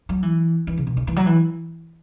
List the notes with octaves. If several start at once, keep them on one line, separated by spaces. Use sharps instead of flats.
F#3
E3
E3
C#3
B2
C#3
E3
F#3
E3